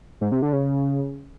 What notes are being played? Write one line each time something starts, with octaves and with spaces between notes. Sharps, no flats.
G#2
C3
D3
C#3